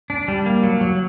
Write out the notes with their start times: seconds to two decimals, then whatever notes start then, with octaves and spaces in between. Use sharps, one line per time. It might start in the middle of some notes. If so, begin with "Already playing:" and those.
0.10 D4
0.28 G3
0.46 A#3
0.63 F#3
0.81 F#3